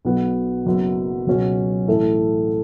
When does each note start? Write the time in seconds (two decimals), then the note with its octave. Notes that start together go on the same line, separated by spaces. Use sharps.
0.05 B1 B2 B3
0.66 F#1 F#2 F#3 B3
1.27 C#2 B2 F#3 C#4
1.88 A1 A2 A3 E4